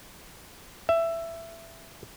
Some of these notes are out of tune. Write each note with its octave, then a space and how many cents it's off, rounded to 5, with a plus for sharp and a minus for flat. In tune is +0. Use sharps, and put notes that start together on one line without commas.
E5 +15